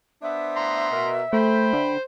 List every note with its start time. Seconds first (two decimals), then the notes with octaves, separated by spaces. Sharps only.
0.22 B3 D4 C5 E5
0.56 A#5 C6
0.91 B2 A#4
1.33 A3 C5 G5 B5
1.73 D3